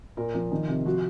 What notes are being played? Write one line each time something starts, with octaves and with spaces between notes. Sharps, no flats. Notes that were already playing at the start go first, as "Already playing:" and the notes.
A#2 A#4
F3
D#3
C3
F3 F#4